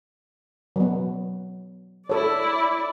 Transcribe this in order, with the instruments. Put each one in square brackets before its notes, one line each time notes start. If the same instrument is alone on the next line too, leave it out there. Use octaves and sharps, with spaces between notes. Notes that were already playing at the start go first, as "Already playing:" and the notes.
[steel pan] F#3 B3
[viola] E4 D5 [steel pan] A4 C#5